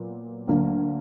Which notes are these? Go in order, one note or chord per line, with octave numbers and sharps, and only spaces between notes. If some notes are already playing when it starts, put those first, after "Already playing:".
Already playing: A#2 F#3 B3
D2 D3 F#3 A#3 D4